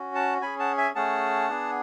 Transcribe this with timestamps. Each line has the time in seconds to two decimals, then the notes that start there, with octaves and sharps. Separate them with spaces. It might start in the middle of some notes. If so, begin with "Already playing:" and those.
Already playing: C#4 F#4
0.15 F#5 A5
0.42 C#4 G#4 G#5 B5
0.59 F#5 A5
0.78 E5 G#5
0.95 A3 C#4 G#4 F#5 A5
1.49 B3 D4 G#4